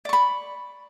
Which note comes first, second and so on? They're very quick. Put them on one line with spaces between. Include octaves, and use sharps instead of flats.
D5 C#6 B5